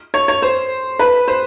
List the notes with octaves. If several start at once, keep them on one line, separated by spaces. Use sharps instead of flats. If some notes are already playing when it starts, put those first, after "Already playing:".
C#5
C#5
C5
B4
C5